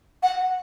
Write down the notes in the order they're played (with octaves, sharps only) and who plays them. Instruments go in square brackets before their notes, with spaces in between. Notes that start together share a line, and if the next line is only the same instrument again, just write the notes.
[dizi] F#5